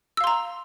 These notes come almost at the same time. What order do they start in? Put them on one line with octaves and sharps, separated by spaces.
E6 F5 C6 A#5